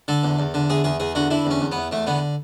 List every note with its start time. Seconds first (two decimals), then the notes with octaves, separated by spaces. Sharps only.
0.08 D3 A4
0.24 E2
0.39 E2
0.54 D3
0.70 E2 G#4
0.84 E2 G#4
1.00 E2 G#4
1.15 D3 F#4
1.30 D3 E4
1.46 E2
1.51 C#4
1.61 E2
1.72 E2 B3
1.91 E2 A3
2.07 D3 B3